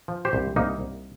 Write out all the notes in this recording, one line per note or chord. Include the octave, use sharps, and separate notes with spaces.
F3
G4 C5
C2
C2 A#3 D#4
C2